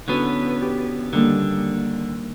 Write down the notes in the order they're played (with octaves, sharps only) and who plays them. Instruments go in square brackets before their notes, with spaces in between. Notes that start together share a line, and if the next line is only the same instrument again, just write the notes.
[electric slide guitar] D3 B3 [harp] C#4 E4 F#4
[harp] G4
[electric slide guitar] D3 [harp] D#3 G3 A#3